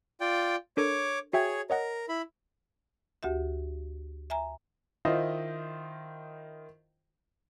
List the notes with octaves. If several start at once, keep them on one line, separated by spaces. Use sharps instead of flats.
F4 D5 G5
D4 A4 A#4 C#5 D6
F#4 G#4 C#5 E5 G5
A#4 C#5 D#5 F#5
E4 B5
D2 F#4 G4 E5
E5 G#5 A#5
D#3 E4 F4 C5 D#5